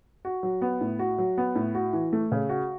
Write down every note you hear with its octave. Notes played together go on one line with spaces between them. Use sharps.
F#4
F#3
B3
A2
F#4
F#3
B3
A2
F#4
E3
A3
C#3
F#4